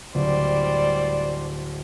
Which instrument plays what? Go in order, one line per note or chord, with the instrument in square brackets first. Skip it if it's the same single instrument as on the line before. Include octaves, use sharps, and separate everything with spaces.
[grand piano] D1 [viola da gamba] G3 C5 D5